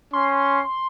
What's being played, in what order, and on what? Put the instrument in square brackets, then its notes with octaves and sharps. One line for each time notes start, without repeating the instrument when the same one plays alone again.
[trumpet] C#4 [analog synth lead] C6